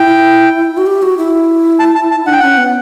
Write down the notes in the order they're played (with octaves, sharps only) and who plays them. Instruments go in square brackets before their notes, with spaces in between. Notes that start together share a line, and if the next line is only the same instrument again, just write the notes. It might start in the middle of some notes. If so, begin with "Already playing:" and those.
Already playing: [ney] E4 [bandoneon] G5
[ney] F#4
G4
F#4
E4
[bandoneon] A5
A5
A5
[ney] D4 [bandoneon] F#5
[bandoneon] G5
[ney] C#4 [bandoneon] F#5
[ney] B3